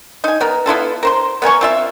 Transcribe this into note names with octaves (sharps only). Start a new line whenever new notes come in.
D#4 G#5
B3 A#4
B3 E4 F4 A4
A#4 C5 C6
B3 A#4 G#5 C#6
C4 F4 E5